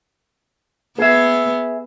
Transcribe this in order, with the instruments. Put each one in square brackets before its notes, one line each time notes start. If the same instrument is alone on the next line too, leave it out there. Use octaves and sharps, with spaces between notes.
[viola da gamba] B3 [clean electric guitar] G#4 E5